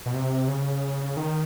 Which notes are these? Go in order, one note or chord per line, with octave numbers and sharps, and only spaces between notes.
B2
C3
C#3
D#3